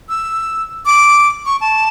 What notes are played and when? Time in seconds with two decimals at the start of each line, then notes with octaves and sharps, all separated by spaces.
0.09 E6
0.86 D6
1.46 C#6
1.61 A5